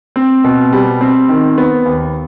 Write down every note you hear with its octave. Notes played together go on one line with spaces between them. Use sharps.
C4
B2
G3
C4
D#3
B3
D#2